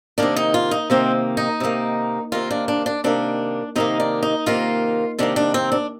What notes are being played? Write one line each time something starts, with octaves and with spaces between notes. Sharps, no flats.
C3 D#3 A#3 D4
D#4
F4
D#4
C3 D#3 A#3 C4
D#4
C3 D#3 A#3
C3 D#3 A#3 F4
D4
D4
D4
C3 D#3 A#3 D4
C3 D#3 A#3 D#4
D4
D#4
C3 D#3 A#3 F4
C3 D#3 A#3 D4
D4
C4
D4